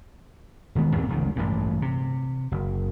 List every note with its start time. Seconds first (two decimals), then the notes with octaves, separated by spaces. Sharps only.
0.75 E1 D#3 G#3 B3
0.96 D#2 A#2 C4
1.09 F1 C#2 D#3
1.36 A1 G2 A#2
1.82 C3
2.52 F#1